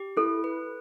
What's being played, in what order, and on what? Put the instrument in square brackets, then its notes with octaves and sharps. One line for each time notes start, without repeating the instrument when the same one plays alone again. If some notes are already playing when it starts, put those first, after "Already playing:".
Already playing: [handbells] G4
[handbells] E4 [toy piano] A4
[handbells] B4